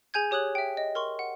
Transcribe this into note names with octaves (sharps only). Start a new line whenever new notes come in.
G#4 G#5 G6 G#6
G4 C#5 D#6 F#6 F#7
E5 G5
D#5
A#4 C6 C#6
F#5